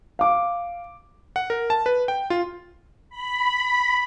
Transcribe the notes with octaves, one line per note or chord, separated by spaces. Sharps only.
F5 D6
F#5
A#4
A5
B4
G5
F4
B5